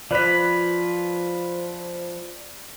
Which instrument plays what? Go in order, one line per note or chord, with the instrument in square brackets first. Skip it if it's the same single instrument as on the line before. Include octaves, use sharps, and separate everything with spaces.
[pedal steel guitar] F3 B4 [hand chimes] D5 B6